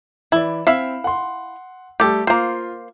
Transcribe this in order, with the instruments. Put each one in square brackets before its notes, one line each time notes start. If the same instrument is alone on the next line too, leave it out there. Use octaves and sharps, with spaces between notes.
[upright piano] E3 D5 [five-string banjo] E4
[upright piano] C4 [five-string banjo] E4 E5 F5
[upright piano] F#5 C6
[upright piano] G3 A3 [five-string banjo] G4 A4
[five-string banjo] A#3 C5 [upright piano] F4